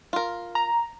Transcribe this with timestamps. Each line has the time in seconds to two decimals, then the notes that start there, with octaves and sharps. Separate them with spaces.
0.13 F4 A#4
0.55 A#5